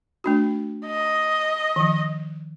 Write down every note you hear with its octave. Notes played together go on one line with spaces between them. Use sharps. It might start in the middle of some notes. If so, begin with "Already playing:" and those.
A3 D4 F#4
D#5
D#3 F3